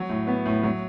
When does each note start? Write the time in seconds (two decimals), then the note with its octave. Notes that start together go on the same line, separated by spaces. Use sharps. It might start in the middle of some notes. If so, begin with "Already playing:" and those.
Already playing: F#3
0.09 A2
0.27 B3
0.46 A2
0.63 F#3